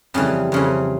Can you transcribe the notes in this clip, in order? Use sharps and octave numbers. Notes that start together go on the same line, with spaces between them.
F2 C#3 E3 G3
F2 C#3 E3